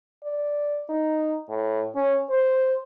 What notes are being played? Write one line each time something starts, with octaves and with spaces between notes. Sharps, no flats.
D5
D#4
A2
C#4
C5